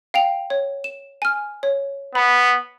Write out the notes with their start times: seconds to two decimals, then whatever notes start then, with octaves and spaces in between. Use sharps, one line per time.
0.14 F5 G5 F7
0.50 C#5
0.84 E7
1.22 G#5 F6
1.63 C#5
2.15 B3 B5